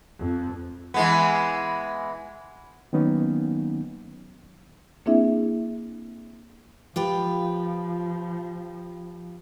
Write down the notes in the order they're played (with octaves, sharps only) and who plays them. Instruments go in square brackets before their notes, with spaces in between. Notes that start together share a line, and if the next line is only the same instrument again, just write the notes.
[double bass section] F2
[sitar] E3 G#3 B3
[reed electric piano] D#3 F#3 A#3 B3 C#4 D#4
[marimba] A#3 C4 D4 E4 G#4 E5
[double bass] F3 [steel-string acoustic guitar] F4 G4 B4